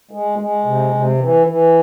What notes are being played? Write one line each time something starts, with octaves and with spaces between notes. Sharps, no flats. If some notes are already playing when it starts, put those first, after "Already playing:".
G#3
G#3
C3
C3
E3
E3